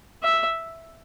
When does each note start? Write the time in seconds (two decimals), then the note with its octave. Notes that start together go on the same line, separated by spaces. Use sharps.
0.23 E5